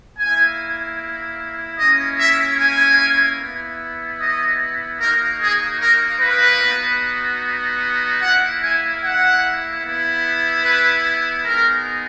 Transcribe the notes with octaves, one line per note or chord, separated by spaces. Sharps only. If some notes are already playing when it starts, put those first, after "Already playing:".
A#3 E4 G#5
A#3 C#4 E4 D#5
E5
G#5
B3 E4
D#5
A#3 D#4 F#4 A#4
G#4
A#4
B4
B3 D#4 F#4
A#3 E4 F#5
G#5
F#5
B3 E4
B4
G#3 B3 D#4 A#4